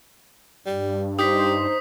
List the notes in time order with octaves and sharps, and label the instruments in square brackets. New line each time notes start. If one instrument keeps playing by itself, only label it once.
[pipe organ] G2 [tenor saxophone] G3
[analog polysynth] D#4 C5 [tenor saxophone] G4 [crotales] D#6 B6